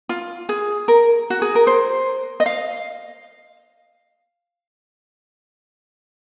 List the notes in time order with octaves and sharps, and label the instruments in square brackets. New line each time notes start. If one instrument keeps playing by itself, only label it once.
[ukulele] F4
G#4
A#4
F#4
G#4
A#4
C5
D#5
F5